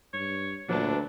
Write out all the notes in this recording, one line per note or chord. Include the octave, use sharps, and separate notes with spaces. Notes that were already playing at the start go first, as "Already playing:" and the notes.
G2 C#5
D2 A#2 F#3 D4 B4 A5